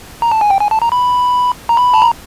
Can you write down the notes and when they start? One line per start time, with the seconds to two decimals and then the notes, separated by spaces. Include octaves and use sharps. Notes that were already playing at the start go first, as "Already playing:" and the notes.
0.22 A#5
0.31 A5
0.41 G#5
0.50 G5
0.60 G#5
0.71 A5
0.82 A#5
0.92 B5
1.69 A#5
1.77 B5
1.94 A5
2.02 A#5